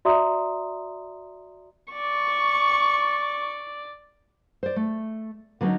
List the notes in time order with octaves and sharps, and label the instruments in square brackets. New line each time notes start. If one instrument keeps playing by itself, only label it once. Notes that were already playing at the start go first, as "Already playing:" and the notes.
[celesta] F#4 D5 E5 A#5 C6 D#6
[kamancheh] D5 [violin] C#6
[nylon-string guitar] C5 D5
A3
D3 F#3 A#3 C4 C#4 D#4